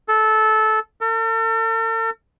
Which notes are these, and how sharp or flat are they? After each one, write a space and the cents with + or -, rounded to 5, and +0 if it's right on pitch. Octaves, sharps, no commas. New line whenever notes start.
A4 -15
A4 +45